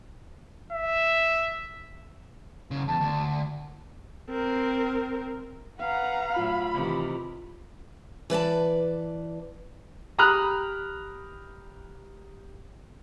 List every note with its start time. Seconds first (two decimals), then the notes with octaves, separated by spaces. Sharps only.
0.72 E5
2.71 F#2 C#3
2.88 E2 A5
3.00 D2
4.30 C4 A#4
5.80 B4 F5 F#5 A#5
6.36 A2 F#3 F4 B5
6.74 C3 D#3 E3
8.30 E3 B4 D5 A5
10.18 G4 A#5 B5 D#6 F6 F#6